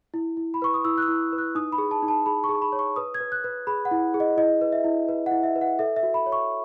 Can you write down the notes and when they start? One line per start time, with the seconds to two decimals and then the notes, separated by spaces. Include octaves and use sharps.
0.14 E4
0.37 E4
0.54 B5
0.62 B4 C#6
0.74 D#6
0.85 E4 E6
0.98 F#6
1.02 E6
1.08 E4
1.32 B4
1.38 F#6
1.55 D#4 D#6
1.72 B5
1.78 G#4
1.91 A5
2.02 D#4
2.08 A5
2.26 G#4 B5
2.44 C#6
2.49 G#4
2.62 B5
2.72 C#5
2.79 C#6
2.96 B4 D#6
3.14 G#6
3.20 B4
3.32 F#6
3.44 B4
3.67 G#4 B5
3.85 F#5
3.91 E4
4.14 G#4
4.20 D#5
4.37 E4 D#5
4.61 B4
4.72 E5
4.84 E4
5.09 B4
5.26 E4 F#5
5.43 E5
5.56 B4
5.61 F#5
5.79 A4 E5
5.96 E5
6.03 F#4
6.14 B5
6.26 C#5
6.32 C#6